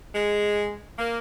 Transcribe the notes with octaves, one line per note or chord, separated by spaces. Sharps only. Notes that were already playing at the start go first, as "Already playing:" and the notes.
G#3
A#3